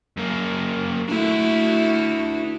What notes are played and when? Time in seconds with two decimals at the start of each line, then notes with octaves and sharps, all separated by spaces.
0.17 F#2 A#3
1.09 A3 D4 E4 F#4 E5